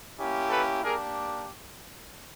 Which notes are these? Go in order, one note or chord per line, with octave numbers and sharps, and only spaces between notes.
A#3 C#4 E4 G4
A4 B4
A#3 D4 G4 G#4 A#4